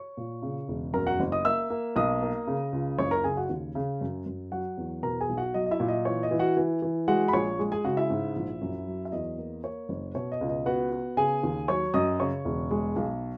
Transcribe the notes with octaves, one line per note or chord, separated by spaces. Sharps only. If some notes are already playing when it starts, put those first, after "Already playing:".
Already playing: C#5 C#6
A#2
C#3
E1
F#2 A#4 A#5
F#4 F#5
F#1
D#5 D#6
A#3 E5 E6
A#3
B1 D#5 D#6
A#3
C#3
C#2
F#1 C#5 C#6
A#4 A#5
C#3 G#4 G#5
F#4 F#5
D#2
C#3
F#2
F#2
F#3 F#4 F#5
E2
B2 A#4 A#5
G#4 G#5
B1
F#4 F#5
F#3 D#5
D#5
E4 E5
A#2
D#5
E3 C#5
D#5
E3
F#4 F#5
E3
E3
G#3 F#4 F#5
B5
A#1 C#5 C#6
G#3
G#4 G#5
C#3 F#4 F#5
E4 E5
G#2
A#1
F#2
F#3
E5
E2 D#5
A#3
A#3 C#5
F#1
B2 C#5
D#5
C#2
D#5
B3 F#4 F#5
B3
C#3 G#4 G#5
D#2
F#3 C#5 C#6
F#2 D#5 D#6
C#3 C#5 C#6
E1
G#3
B1